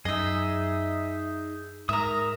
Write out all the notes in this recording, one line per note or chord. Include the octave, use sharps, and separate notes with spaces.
F#2 D#4 G#4 D#5 E5
G#2 A#4 E5 A#5 D#6